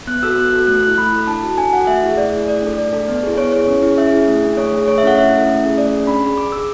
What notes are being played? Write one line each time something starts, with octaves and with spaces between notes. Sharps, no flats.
B3 F#6
F#4 A4 E6
B3 F#6
F#4 A4
A3 F#6
E4 A4 F#6
A3 B5
E4 A4
D4 A5
F#4 A4
D4 G#5
F#4 A4 F#5
A3 E5
E4 G#4
A3 D5
E4 G#4
A3 D5
D4 A4
A3 D5
D4 A4
B3
E4 G#4
B3 C#5
E4 G#4 C#5
C#4
E4 G#4
C#4 E5
E4 G#4
A3
D4 G#4
A3 C#5
D4 G#4
A3 C#5
E5
C#4 E4 A4 F#5
A3 E5
C#4 E4 A4
A3
C#4 G#4
A3 D5
C#4 G#4
D4 B5
G#4
D4 D6
G#4 E6